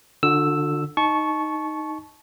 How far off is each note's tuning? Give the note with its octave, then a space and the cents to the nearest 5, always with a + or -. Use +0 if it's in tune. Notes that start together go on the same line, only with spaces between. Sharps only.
D3 +15 F#4 -45 E6 +0
D#4 +0 A5 -25 C#6 +0